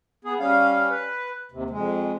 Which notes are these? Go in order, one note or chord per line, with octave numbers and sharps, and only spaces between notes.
B3 G#4
G3 C#4 F5
B4
D#2 C3
F2 G#3